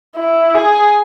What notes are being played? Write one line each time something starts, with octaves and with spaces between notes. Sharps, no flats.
E4
G#4